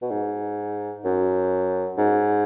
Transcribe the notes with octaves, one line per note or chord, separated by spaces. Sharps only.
B2
G#2
F#2
G#2